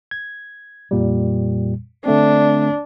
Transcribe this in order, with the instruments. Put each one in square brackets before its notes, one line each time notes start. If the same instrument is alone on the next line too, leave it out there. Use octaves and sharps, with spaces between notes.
[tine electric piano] G#6
F2 A#2 G3
[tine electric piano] D3 A3 C4 [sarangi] D4